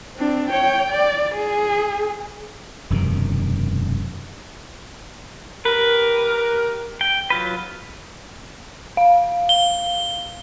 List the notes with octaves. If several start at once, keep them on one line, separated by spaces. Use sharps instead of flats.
C4 D4
C#5 G5
D5
G#4
E1 F#2 C3 D#3
G4 A#4 B4
G5
F#3 F4 B4
F5
G7